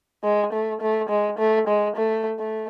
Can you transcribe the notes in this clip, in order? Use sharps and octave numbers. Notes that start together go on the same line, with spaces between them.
G#3
A3
A3
G#3
A3
G#3
A3
A3